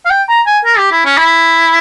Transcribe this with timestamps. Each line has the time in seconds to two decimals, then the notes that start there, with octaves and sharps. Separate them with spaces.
0.06 F5
0.10 G5
0.29 A#5
0.46 G#5
0.65 A#4
0.78 G4
0.92 E4
1.05 C#4
1.18 E4